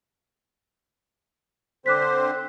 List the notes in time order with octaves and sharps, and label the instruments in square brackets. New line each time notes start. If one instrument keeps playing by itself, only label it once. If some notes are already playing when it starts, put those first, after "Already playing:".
[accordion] D3 C4 C5 [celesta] D6 F#6 B6